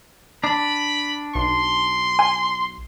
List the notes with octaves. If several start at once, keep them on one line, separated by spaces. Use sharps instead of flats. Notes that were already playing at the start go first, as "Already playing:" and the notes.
D4 B5
B1 C6
G#5